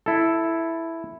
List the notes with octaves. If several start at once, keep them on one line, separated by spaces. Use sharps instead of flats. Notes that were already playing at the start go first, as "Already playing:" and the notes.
E4 A4